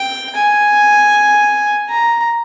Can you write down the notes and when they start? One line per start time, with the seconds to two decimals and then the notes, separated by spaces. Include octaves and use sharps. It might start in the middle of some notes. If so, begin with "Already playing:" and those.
Already playing: G5
0.36 G#5
1.89 A#5